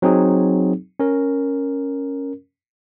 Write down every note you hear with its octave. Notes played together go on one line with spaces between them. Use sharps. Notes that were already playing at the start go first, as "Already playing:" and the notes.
F#3 C4 D#4 G#4
C#4 A#4